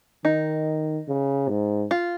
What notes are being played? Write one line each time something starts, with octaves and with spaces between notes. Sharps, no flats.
D#3 D#4
C#3
G#2
F4